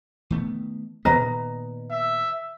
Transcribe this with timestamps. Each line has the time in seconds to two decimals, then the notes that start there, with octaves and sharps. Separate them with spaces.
0.30 D#3 A3 B3
1.05 A#2 D#3 B3 B4 D#5 A#5
1.91 E5